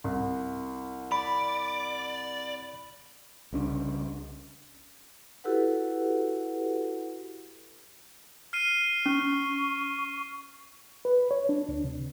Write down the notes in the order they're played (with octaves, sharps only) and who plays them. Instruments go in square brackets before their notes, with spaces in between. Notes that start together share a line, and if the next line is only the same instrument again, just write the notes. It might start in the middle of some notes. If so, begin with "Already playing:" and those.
[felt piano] C2
[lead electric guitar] D5 [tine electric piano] B5
[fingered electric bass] C2 C#3 D4
[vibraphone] E4 F#4 G4 A4 B4 F#5
[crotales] F6 C7 D#7
[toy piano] C#4 [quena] C#6
[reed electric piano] B4
C#5
D4
D2
C3